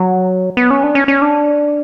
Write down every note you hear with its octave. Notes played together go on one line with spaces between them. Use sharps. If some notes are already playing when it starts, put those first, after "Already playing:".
Already playing: F#3
B3
C#4
D4
C#4
C#4
D4